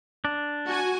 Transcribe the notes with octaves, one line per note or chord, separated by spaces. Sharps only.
D4
F#4 G#5